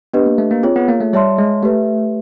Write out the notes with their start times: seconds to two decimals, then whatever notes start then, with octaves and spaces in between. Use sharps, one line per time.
0.14 B3 D4 G4 B4 D#5
0.26 A#3
0.38 A3
0.51 A#3
0.63 C4 F4 G#4 C#5
0.76 B3
0.88 A#3
1.00 A3
1.13 G3 C#5 E5 A5 C6
1.38 G#3
1.63 A3 G4 B4 E5